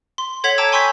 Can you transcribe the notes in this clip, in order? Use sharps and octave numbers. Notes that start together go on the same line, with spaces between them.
C6
A4 C#5 F#5 G#6 B6 F7
G5 A5 A#5 D6 E6
G#5 C6 C#6 E6 G6 B6